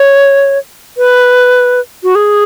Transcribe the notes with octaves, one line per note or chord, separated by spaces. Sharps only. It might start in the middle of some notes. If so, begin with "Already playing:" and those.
Already playing: C#5
B4
F#4
G#4